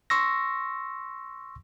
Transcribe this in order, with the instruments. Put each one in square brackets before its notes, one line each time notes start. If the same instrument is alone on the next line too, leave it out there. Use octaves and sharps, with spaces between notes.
[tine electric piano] C6 C#6 E6 A#6